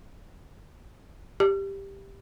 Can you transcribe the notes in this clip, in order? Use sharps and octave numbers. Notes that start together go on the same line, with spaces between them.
G4